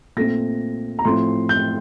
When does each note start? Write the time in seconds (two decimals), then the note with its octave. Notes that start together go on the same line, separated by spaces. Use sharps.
0.16 A#2 A3 C4 A#6
0.99 A#5
1.05 A2 F3 A3 C4 C6
1.49 G6